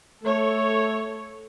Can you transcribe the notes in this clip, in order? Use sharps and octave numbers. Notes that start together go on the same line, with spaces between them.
A3 A4 C#5